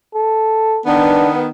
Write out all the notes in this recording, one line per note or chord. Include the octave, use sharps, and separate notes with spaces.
A4
D#3 B3 D4